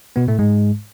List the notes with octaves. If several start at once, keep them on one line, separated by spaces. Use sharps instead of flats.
B2 B3
A2 A3
G#2 G#3